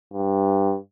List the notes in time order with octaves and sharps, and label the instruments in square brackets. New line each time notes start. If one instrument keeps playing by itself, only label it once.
[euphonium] G2